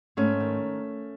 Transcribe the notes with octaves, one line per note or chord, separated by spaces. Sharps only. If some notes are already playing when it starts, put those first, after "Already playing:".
G#2 A3 C#4
D#3